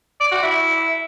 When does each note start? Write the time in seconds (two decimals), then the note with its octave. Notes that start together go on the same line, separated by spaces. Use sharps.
0.21 D5
0.31 F#4
0.42 E4